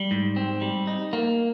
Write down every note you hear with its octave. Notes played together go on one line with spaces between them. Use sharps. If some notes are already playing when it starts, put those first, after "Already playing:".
Already playing: G3
G#2
C4
G3
D#4
A#3